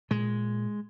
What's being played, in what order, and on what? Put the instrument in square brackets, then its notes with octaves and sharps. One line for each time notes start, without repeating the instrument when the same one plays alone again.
[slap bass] A#2 G#3